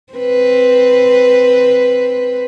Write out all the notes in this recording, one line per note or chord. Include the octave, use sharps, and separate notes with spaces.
C4 B4